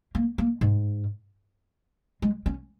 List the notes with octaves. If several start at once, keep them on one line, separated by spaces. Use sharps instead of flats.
A#3
A#3
G#2
G#3
C#4